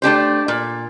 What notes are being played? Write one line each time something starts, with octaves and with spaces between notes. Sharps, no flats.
A3 D4 G4 C5
A#2